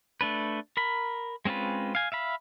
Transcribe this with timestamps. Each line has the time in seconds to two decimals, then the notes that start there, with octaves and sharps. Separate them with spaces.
0.21 A3 D4 B4
0.77 A#4 B5
1.45 G#3 C4 C#4 F4 B4
1.95 F5 G#5
2.12 E5 F5 B5